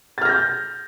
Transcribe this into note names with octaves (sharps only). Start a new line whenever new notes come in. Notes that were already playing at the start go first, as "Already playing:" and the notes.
F6 G6 A6 A#6